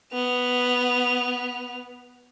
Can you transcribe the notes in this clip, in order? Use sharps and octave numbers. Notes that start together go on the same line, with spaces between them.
B3 F7